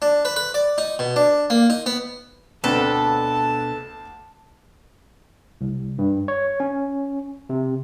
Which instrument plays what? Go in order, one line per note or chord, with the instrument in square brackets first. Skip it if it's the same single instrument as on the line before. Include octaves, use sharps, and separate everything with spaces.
[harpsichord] D4
B4
B4
D5
D#4
B2
D4
A#3
D#4
B3
[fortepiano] D2 D3 C4 [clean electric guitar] B2 D4 [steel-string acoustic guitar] A4 B4 [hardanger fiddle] A5
[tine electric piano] C2
G2
C#5
C#4
C3